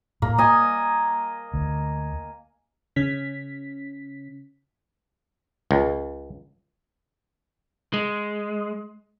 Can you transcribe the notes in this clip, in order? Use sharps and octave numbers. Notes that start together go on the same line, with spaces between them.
A2 A#3
A#3 D#5 G#5
D2
C#3 C#4 B6
C#2
G#3